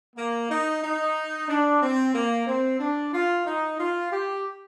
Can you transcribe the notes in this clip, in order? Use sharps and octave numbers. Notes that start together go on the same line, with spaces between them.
A#3
D#4
D#4
D4
C4
A#3
C4
D4
F4
D#4
F4
G4